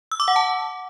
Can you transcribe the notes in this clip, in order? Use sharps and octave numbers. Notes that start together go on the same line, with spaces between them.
E6
D6
F#5
A5